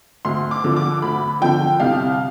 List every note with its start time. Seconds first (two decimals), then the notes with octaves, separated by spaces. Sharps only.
0.25 D2 C6
0.51 D6
0.64 D3 F3
0.76 D6
1.02 D2 B5
1.41 D3 F3 G5
1.80 C2 F5